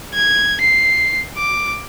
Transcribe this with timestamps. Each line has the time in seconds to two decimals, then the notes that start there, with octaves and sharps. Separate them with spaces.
0.14 G#6
0.61 C7
1.37 D6